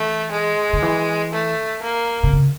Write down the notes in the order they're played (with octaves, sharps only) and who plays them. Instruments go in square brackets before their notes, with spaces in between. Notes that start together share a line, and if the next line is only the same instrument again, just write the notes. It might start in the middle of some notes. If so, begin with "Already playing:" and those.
Already playing: [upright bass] E3 [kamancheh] A3
[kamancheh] G#3
[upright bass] D#3
E3
[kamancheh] A3
A#3
[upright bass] C3
C#3